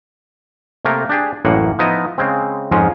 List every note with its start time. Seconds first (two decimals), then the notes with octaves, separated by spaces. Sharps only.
0.85 C3 A3 A#3 A#4
1.09 D4 G4 G#4
1.45 A1 F#2 A2 A#3 F#5
1.79 F3 B3 D#4 E4 D#5
2.18 C#3 G#3 C4
2.71 F2 G#2 F3 G#3 C#4